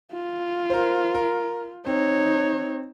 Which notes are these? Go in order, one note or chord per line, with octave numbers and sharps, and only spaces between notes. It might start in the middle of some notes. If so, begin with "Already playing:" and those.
F4
A#4 C5
A#4
C4 D#4 C#5